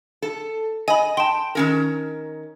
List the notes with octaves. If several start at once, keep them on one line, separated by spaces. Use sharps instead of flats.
A4
D#5 G#5 B5
G5 A5 C6
D#3 C#4 A#4